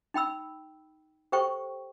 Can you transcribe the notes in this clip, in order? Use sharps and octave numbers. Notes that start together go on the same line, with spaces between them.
D#4 G5 B5 E6
G4 A4 C5 G5 C#6